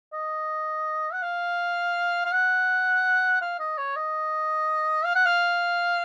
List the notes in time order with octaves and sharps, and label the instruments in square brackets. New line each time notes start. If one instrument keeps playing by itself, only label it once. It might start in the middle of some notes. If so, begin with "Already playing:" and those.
[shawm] D#5
F#5
F5
F5
F#5
F5
D#5
C#5
D#5
F5
F#5
F5